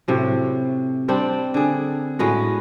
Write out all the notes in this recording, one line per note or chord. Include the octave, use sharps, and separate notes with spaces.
A2 C3 F#3
G3 C4 D4 G4
D3 G#4
A2 G#3 B3 F#4